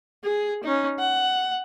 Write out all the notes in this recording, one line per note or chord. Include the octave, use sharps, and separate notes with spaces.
G#4
C#4 D#4
F#5